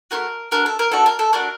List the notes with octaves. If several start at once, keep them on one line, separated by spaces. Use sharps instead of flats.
A3 D4 F#4 A#4
A3 D4 F#4 A#4
A4
A#4
A3 D4 F#4 A4
A#4
A4
A3 D4 F#4 A#4